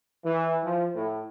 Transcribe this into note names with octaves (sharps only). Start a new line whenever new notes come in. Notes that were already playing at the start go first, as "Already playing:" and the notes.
E3
F3
A2